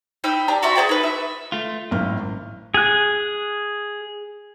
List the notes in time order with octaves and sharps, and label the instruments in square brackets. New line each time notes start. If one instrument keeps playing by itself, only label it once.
[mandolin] D#4 G5 B5 E6
D4 G4 A#5
F#4 D5 E5 C6
G#4 C5 D5 G5
D#4 B4
E5
[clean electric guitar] A3 F4
[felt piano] G#1 A2 F6 [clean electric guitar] F#2
[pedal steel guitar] G#4 F#6